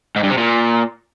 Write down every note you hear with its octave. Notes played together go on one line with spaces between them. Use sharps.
G#2
G2
C3
A#2